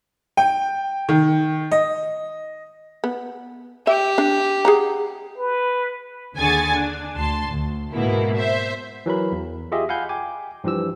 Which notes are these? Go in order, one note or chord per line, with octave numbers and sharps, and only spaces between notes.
G5
D#3
D#5
B3
G4 E5
D4
G#4 F#5 A#5
B4
D#2 D3 G#4 G#5 C#6 A6
D4
D2 A5 C6
D2
G#2 B2 A#3 E4
C5 E5
E3 F#3 A#4 B5
E2
F4 G4 G#4 D#5 E5
F5 F#5 G#5 B5 G6
G5 G#5 D6
G2 E3 F3 G4 E6